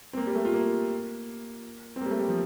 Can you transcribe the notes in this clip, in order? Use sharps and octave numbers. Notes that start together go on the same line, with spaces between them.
C4
A#3
G3
A3
F4
A#3
C4
G3 A#3
A3
G3
F3